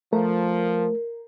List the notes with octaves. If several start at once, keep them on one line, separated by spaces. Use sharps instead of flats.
F3 A3 A#4